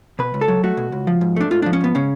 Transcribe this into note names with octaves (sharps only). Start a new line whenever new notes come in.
B2 B4
C#2
A4
F#3
A3 F#4
B2
C#2
F3
G#2
A3 D4
G#2 F4
F3 D4
C#4
G#2 B3
C#3 C#4